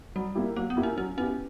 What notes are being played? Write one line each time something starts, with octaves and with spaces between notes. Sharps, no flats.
F#3 G3
A#3 E4 G4
F#3 A#3
B3
A#3 E4 G4
C#4
F#3 C#4
B3 C#4 E4 G4